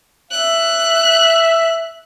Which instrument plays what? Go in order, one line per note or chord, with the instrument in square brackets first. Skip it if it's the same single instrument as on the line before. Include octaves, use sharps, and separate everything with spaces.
[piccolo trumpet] E5 [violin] F#6